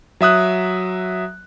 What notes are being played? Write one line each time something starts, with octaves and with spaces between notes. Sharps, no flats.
F#3 E5 D#6 F#6